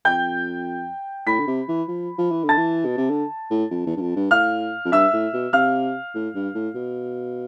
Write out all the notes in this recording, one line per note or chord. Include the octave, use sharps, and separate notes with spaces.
F2 G5 G6
A2 B5 B6
D3
C3
E3
F3
F3
E3
D3
A5 A6
E3
B2
C3
D3
A2
F2
E2
G2
F2
G2
A2 F5 F6
F2
G2 E5 E6
A2
B2
C3 F5 F6
A2
G2
A2
B2